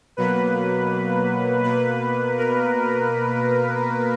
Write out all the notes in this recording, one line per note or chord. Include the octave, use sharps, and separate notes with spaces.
B2 F#3 A#3 B4
B2 A#3 B4
A#4